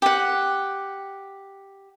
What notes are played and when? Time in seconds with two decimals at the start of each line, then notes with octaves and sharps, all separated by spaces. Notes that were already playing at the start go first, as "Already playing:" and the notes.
0.02 G4 F#5